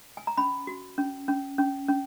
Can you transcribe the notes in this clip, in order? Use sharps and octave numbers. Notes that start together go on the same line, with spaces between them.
G#5
A#5
C#4 B5
F#4
C#4
C#4
C#4
C#4